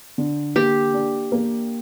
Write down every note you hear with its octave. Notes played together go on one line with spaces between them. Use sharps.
D3
A#3 G4
D4
A#3